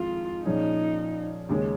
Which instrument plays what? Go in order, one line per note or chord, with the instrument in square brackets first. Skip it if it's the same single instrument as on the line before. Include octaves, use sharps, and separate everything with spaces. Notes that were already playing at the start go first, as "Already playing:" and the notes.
Already playing: [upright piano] F2 D#3 G#3 D#4 [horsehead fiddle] F4
[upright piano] A#2 F3 C#4 G#4 [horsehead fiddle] D#4
[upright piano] D#2 C#3 G#3 C#4